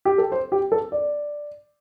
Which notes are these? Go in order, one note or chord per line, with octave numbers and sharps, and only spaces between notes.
G4
A4
C5
G4
A4
D5